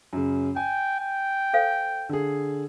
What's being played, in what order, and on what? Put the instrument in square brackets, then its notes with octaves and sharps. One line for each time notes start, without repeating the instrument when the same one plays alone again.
[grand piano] F#2 C#3
[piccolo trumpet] G5 [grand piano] G#5
[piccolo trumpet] G5
[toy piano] A4 C5 F5
[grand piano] D3 G#4